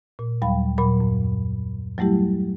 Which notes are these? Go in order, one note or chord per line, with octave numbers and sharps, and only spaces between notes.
A#2
D#2 F#3 G3 F5 G5 B5
A#2 F#3 B5
F#2
F#3 G3 A3 E4 G4